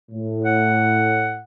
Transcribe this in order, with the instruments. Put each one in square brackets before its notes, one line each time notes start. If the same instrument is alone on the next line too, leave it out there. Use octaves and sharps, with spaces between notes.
[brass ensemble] A2
[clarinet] F#5